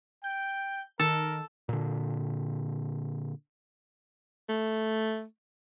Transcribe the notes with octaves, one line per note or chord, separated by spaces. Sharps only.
G5 G6
D#3 A4 A#4
A#2 D3
A3